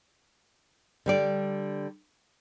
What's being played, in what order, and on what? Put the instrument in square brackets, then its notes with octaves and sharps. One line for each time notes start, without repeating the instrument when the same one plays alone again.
[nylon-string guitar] D3 G3 D5